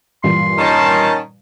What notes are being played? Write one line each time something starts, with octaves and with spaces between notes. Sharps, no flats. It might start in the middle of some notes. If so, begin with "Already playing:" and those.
G2 A#2 E3 C6
D#3 C#4 A5